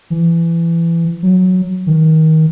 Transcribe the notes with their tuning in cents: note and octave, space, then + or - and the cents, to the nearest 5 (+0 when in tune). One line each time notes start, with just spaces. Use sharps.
E3 +25
F#3 -5
D#3 +25